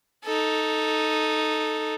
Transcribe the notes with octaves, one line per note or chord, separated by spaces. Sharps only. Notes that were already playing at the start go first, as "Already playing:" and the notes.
D#4 A4